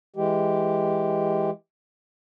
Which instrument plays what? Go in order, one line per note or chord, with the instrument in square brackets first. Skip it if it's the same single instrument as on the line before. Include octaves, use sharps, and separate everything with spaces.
[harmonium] E3 G#3 G4